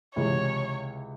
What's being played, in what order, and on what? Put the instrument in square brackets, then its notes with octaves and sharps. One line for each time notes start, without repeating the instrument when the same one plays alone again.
[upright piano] C#2 C3 E3 [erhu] C#5